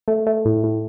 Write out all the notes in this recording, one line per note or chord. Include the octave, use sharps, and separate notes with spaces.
A3
A3
A2
A2